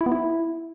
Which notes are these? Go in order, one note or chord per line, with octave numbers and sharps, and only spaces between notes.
E4
B3
E4